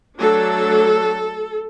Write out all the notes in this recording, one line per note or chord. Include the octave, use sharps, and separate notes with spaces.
F#3 A3 D4 A4